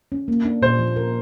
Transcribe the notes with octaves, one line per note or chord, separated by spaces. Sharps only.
C#4
A#3
D4
A#2 C5
F3
A#4